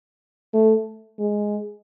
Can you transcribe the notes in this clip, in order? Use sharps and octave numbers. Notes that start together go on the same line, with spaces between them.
A3
G#3